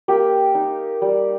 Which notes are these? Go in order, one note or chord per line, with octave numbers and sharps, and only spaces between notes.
A#3 G4
D#4
G3